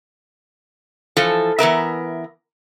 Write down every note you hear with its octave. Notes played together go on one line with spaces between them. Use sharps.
E3 F3 A4
E3 B3 A#4 E5